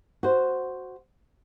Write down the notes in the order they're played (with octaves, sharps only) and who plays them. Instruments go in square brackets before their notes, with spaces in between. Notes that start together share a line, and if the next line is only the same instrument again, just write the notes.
[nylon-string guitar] F#4 C5